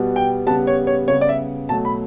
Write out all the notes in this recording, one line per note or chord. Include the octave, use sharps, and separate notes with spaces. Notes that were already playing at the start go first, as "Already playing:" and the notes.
Already playing: B2 G3 B3
G5
C#3 G3 B3 A5
C#5
C#5
C#3 G3 B3 C#5
D5
E5
B2 F#3 A3 A5
B5